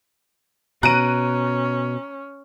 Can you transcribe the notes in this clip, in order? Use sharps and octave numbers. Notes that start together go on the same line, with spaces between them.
B2 C#4 A#5 F#6 D7 D#7